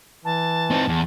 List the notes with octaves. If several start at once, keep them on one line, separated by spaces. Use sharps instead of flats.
E3 A5
C4 D#4
E2